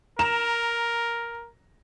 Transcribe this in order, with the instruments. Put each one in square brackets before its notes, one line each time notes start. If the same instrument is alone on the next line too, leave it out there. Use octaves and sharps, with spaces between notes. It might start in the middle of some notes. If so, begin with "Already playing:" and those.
[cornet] A#4 [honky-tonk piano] A#5 E7